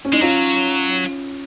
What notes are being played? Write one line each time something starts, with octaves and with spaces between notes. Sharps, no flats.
C#4
G#3 D#4
F#3 C#4 F4